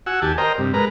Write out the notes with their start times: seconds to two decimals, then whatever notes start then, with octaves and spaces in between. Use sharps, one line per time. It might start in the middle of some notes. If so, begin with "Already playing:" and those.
0.06 F#4 F#5 G#5 E6
0.22 D#2 G4 G#5 A5
0.38 A#4 C5 D#5 G5 A#5
0.58 G2 C3
0.74 G#3 A#4 B4 A#5